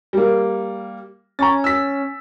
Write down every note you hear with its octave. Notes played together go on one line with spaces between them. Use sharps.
G3 A#3
C#4 A#5 C#6 A6
E6 B6